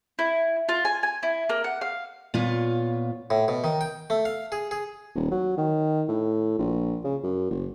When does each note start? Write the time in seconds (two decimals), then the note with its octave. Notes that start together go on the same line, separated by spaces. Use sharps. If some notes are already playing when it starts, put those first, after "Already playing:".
0.19 E4
0.69 F4
0.85 G#5
1.03 G#5
1.23 E4
1.49 A#3
1.64 F#5
1.81 F5
2.34 A#2 B3 F4 C#5
3.30 A2
3.48 B2
3.64 D#3
3.81 G5
4.10 A3
4.25 F5
4.52 G#4
4.71 G#4
5.15 D#1
5.31 F#3
5.57 D#3
6.08 A2
6.59 A#1
7.04 C#3
7.23 F#2
7.51 F#1